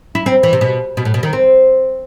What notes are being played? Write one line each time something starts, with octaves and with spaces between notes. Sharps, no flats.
E4
C4
E3
C3
B2
B2
A2
B2
D#3
C4